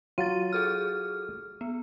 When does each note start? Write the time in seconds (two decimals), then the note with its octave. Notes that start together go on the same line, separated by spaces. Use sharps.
0.18 F#3 F4 A6 D#7
0.53 G#4 A4 F6
1.61 B3